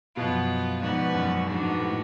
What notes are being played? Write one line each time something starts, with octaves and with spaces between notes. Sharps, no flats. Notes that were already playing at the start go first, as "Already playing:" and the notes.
F#2 B2 F3 B3 F4
G#2 F3 B3 F#4 B4 D5
F#2
G#2 F3 G#3 B3 D4 F#4
G#2
A2